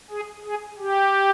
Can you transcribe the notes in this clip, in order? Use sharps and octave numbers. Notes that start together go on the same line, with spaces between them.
G#4
G#4
G4